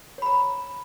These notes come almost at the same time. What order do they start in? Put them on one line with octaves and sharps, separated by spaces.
C#5 B5 A#5